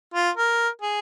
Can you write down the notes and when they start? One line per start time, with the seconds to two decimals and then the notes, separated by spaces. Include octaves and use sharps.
0.14 F4
0.37 A#4
0.81 G#4